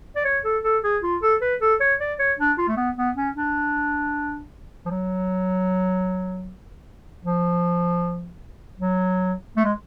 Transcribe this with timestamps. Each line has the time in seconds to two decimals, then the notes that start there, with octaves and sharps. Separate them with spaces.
0.16 D5
0.25 C#5
0.44 A4
0.64 A4
0.84 G#4
1.03 F4
1.22 A4
1.41 B4
1.61 A4
1.80 C#5
2.00 D5
2.19 C#5
2.39 D4
2.58 F4
2.68 A3
2.77 B3
2.97 B3
3.16 C#4
3.36 D4
4.86 F3
4.90 F#3
7.24 F3
8.79 F#3
9.57 A3
9.64 G#3